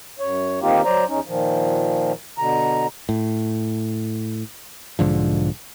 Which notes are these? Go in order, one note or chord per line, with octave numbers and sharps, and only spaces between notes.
F#2 C#5
D#3 A#3 C4 D#4 F4 G4
F#3 C5 D5 A#5
E2 C#4 D#4
A#2 D#3 F3
B2 D3 A#5
A2
B1 G#2 D3 F3